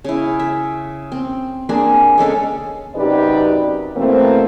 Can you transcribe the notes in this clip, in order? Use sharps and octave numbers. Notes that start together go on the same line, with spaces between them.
C#3 E4
E5
C4
A#3 C4 D4 G#4
C#3 G#3 A4 F5
F#2 C3 D#4 G4 B4 D5
B2 E3 A3 A#3 C4